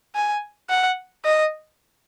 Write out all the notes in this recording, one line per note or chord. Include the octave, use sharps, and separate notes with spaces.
G#5
F#5
D#5